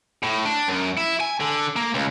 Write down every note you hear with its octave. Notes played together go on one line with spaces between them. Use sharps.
A2
D4
F#2
E4
G#5
D3
A#3
C#2